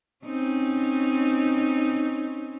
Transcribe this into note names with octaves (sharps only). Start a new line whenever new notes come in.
C4 C#4 D#4